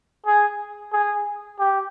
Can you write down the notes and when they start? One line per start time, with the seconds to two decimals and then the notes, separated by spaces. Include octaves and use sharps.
0.27 G#4
0.93 G#4
1.59 G4